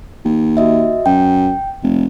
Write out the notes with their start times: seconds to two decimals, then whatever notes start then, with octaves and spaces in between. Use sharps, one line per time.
0.25 D#2
0.57 F#4 D#5 E5
1.06 F#2 G5
1.83 F1